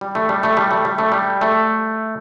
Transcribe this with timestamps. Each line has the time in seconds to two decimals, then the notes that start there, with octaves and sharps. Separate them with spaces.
0.01 G3
0.15 A3
0.29 G3
0.43 A3
0.57 G3
0.71 A3
0.85 G3
0.98 A3
1.12 G3
1.41 A3